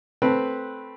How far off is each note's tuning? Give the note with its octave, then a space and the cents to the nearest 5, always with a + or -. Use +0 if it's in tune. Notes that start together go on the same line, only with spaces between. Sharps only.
A3 +0 C4 +0 B4 -10